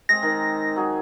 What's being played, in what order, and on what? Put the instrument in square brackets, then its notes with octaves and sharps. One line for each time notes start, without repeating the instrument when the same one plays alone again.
[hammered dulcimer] G#3 C4 [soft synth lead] A#6
[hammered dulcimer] D#3
F#3 G#4